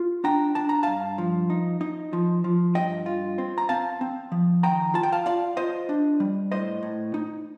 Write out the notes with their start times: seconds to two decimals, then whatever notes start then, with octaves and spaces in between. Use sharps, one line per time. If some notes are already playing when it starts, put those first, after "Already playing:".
Already playing: F4
0.24 D4 G5 A#5
0.55 D4 A5
0.69 A#5
0.83 G2 F5 A5
1.18 F3
1.50 D#4
1.81 D#4
2.13 F3
2.44 F3
2.75 G2 D#5 G5
3.06 F4
3.38 C4
3.58 A#5
3.69 C4 F5 A5
4.01 C4
4.32 F3
4.63 D#3 G5 A#5
4.94 F4 A5
5.03 G5
5.12 F5 A5
5.26 F4 D5 F5
5.57 F4 C5 D#5
5.89 D4
6.20 G3
6.52 A2 C5 D#5
6.83 A2
7.14 D#4